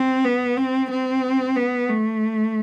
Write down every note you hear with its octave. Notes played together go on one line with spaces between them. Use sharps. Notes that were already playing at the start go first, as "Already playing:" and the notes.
Already playing: C4
B3
C4
C4
B3
A3